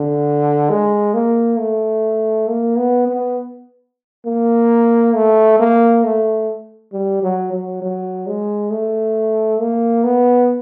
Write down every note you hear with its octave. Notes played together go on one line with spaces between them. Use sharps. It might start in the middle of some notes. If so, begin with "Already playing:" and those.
Already playing: D3
G#3
A#3
A3
A#3
B3
B3
A#3
A3
A#3
A3
G3
F#3
F#3
F#3
G#3
A3
A#3
B3